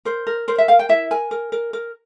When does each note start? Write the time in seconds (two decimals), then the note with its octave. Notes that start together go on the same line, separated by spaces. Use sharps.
0.05 A#4 C5
0.27 A#4
0.48 A#4 C5
0.58 E5
0.68 A#4 F5
0.79 G5
0.89 E4 E5
1.11 A#4 G#5
1.31 A#4
1.52 A#4
1.73 A#4